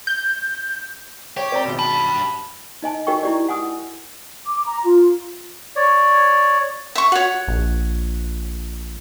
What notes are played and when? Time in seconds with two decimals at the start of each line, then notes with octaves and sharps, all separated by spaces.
0.07 G6
1.37 G4 C#5
1.52 C4 D5 A#5
1.65 G#1 B2
1.79 G2 A5 B5
2.82 D#4 D#5 G#5 A5
3.07 D#4 F#4 A#4 D#5 G5 C#6
3.23 E4 G4 D5
3.49 F#5 G#5 D#6 E6
4.47 D6
4.66 A#5
4.84 F4
5.76 C#5 D5
6.95 E5 C#6
7.12 F#4 C#5 F#5
7.47 A#1